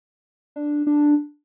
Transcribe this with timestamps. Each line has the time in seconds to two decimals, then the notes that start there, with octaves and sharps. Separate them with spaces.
0.56 D4
0.87 D4